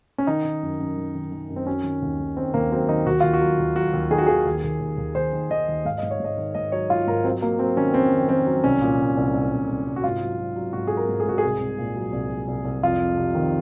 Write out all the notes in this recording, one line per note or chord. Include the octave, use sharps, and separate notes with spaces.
C#4
D#3 D#4
D#3
F#2
F#2
D#3
D#3
D#3
F#2
C4
F#3 C#4
D#3
D#2
D#2
D#3 C4
D#2 A#3
F#3 C4
D#3 D#4
D#2 F#4
D#2 F4
F#4
F#3
D#2
F#3 F#4
D#2
D#3 G#4
F#4
D#3 G#4
D#2
D#2
D#2
D#2
D#2 C5
D#3
D#3 D#5
D#2
G#2 F5
G#2 D#5
C#5
G#2 D#5
D#3
G#2 D#5
F#3 C#5
G#2 F4
G#2 A#4
F#3 C4
F#3 A#3
F#3 C4
D#3 C#4
F2 C4
D#3
D#3 C4
F#3
C2 C#4
A#2
C2
C2
C2
C2
C2
C2
F#4
G#2 F4
F#3
F#3
F#3
G#2 F#4
F#3 G#4
A#4
G#2
G#4
G#2 F#4
G#4
C2
C2
A#2
F#3
C2
F#3
C2
C2
F2 F4
F2
C3
D#3